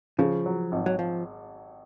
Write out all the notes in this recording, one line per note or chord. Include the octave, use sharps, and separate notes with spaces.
C#3 F3
F#3
G#1
F#3
F3